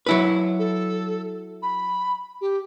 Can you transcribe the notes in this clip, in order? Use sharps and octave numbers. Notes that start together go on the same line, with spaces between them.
F#3 E4 B4
A4
B5
G4